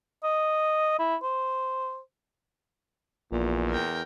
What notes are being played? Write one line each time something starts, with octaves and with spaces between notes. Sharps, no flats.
D#5
E4
C5
A#1 E2 A#2
A#4 G5